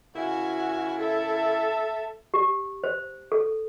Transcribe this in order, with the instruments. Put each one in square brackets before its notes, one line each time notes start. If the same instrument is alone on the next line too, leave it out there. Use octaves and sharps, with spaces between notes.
[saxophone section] C#3 A#3 E4 [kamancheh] F#4 G#5
[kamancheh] A4 E5
[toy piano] G4
C5
A4